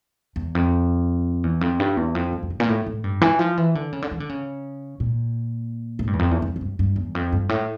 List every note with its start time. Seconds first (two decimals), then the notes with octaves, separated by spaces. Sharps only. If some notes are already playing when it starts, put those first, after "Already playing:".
0.36 E2
0.55 F2
1.43 E2
1.61 F2
1.80 G2
1.97 E2
2.15 F2
2.33 G2
2.43 F2
2.50 G2
2.60 A#2
2.69 A2
2.86 A2
3.04 G2
3.21 E3
3.39 F3
3.57 E3
3.75 D3
3.93 C#3
4.02 D3
4.11 E3
4.20 D3
4.29 C#3
5.00 A#2
5.99 A2
6.07 G2
6.13 E2
6.19 F2
6.31 E2
6.42 F2
6.56 A2
6.61 G2
6.79 G2
6.96 E2
7.15 F2
7.32 G2
7.49 A2